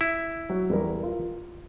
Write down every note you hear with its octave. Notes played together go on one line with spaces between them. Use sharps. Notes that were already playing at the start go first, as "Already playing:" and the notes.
E4
F#3
E2 G3 A#4
F4